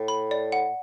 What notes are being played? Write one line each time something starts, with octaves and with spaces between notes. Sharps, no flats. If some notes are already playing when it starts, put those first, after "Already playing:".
Already playing: A2
B5
D5
F#5